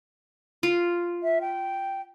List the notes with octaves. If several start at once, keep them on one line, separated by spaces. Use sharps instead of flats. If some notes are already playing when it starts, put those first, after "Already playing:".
F4
E5
G5